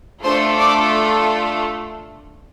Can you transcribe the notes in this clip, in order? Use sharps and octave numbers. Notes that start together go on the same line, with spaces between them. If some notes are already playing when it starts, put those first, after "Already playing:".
A3 D4 F4 A4 C5 C6
D5 D6